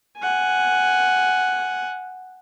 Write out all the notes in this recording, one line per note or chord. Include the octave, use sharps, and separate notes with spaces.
F#5 G#5